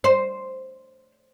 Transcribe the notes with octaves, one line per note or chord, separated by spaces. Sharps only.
C5